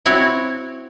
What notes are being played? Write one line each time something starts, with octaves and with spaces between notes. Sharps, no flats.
C4 E4 F#4 C#5